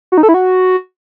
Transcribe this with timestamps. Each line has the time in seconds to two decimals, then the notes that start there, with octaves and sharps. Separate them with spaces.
0.12 F#4
0.18 D#4
0.23 A4
0.29 E4
0.34 F#4